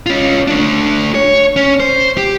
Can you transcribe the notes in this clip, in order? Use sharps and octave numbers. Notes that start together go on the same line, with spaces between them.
C#4 F4
A3 D4
C#5
C#4
C5
G4